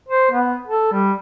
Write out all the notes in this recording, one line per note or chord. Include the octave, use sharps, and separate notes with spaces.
C5
B3
A4
G3